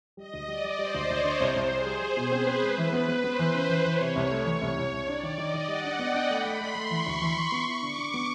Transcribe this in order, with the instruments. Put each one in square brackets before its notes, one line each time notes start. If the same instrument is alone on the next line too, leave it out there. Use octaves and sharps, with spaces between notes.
[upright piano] G3 [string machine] D#5
[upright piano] D2
[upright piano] G3 [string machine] D5
[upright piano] G3
[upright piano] G3 [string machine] C5
[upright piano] D2
[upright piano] D2 [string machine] C#5
[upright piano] D3
[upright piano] C2 [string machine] C5
[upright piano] C2
[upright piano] G3 [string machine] G#4
[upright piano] G3
[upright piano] G3 [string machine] C5
[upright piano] B2
[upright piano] C4 [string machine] B4
[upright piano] C4
[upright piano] G#3 [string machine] B4
[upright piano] E3
[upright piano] B3 [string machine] B4
[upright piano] B3
[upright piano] B3 [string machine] C5
[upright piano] E3
C#3
E3
[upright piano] E3 [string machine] C#5
[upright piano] C3
C2
A3
E3
C2
C2
C2
[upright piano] D4 [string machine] D5
[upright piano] D#3
[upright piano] D#3 [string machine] D#5
[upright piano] D#3
[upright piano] G3 [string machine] F#5
[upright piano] D4
[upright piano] B3 [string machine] G5
[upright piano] D4
[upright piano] A3 [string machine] B5
[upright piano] A3
[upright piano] A3 [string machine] C6
[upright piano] A3
[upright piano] E3 [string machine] C#6
[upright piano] D2
[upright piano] E3 [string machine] C#6
[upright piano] E3
[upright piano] B3 [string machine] C#6
[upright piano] E4
[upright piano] D3 [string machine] D6
[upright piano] D3
B3